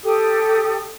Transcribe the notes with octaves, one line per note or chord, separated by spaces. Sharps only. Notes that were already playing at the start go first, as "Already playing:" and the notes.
G4 A4 D#6